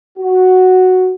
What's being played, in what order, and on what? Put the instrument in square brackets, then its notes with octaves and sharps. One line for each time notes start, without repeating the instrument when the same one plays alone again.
[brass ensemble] F#4